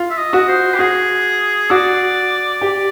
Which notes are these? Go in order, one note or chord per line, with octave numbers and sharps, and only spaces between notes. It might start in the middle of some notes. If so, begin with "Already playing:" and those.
Already playing: F4
E5
D#5
F#4
C5
G4
F#4 G#4
F#4 D5
G4